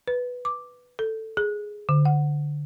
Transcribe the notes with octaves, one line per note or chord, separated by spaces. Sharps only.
B4
D6
A4
G#4
D3
F#5